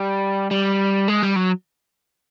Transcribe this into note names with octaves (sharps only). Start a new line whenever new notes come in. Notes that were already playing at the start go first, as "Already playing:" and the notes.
Already playing: G3
G3
G#3
G3
F#3